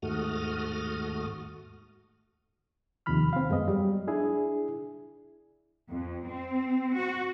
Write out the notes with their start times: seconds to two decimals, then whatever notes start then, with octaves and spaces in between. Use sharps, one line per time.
0.02 D#2 G#2 A3 F#4 D#6 F6
3.06 D#2 C3 D#3 F3 B5 F6
3.33 C4 F5
3.50 F#2 G#3 B3 D#5
3.68 F#3 G3
4.07 D4 E4 G#4
5.90 F2
6.28 C4
6.96 F#4